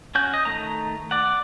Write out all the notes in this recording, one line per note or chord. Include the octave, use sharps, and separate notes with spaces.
C#4 F#4 G6
D#5
D#3 A3 A#5
D5 F#5